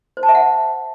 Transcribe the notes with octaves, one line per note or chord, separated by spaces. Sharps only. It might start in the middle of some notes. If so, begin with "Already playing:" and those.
C5
A5
E5
F#5